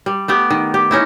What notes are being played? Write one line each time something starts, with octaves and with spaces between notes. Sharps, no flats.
G3
A3 B3 G4
D#3
G4
C#4 D#4 E4